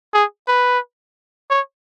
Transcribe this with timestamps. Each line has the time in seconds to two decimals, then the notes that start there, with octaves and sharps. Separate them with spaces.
0.14 G#4
0.48 B4
1.50 C#5